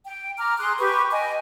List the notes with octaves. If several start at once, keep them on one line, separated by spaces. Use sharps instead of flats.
G5
A#5 D6 F6
G#4 C6 D#6 F#6
G4 B4 C#6 D6
D#5 G5 G#5